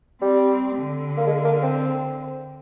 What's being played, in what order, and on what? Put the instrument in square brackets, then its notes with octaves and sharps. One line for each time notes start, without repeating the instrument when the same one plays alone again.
[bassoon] G3 [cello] C4
[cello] D3
[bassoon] A#3
G#3
A#3
C4